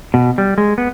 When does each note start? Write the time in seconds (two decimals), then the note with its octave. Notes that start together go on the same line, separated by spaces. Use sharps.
0.14 B2
0.38 G3
0.58 G#3
0.78 B3